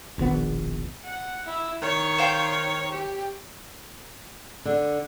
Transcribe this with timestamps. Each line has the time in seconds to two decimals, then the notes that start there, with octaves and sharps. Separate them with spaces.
0.18 E1 A#1 D#3 B3
1.04 F#5
1.46 E4
1.82 D#3 C#5
2.18 C5 F5 G5
2.91 G4
4.65 D3